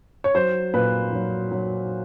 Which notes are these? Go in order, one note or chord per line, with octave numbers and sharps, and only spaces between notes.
C#5
F#3 C5
A#2 B4
F#3
F#3